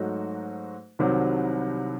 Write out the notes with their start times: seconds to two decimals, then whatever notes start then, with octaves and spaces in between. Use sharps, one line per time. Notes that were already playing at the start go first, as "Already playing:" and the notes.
Already playing: G#2 F#3 A3 D#4 F#4
0.99 C2 C3 D#3 F#3